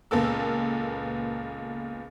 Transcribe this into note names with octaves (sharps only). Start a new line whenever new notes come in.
C#2 A#2 B3 A4 A#4 E6